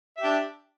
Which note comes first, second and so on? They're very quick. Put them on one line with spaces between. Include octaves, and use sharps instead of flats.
E5 G4 D4